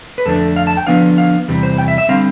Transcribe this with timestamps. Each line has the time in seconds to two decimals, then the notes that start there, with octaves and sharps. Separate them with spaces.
0.18 B4
0.26 F2 D3 A3 D4 A4
0.56 F5
0.67 A5
0.77 G5
0.87 D3 F3 B3 D4 F5
1.18 F5
1.48 E2 C3 E3 G3
1.63 C5
1.78 G5
1.88 E5
1.98 E5
2.09 D3 G3 C4 F5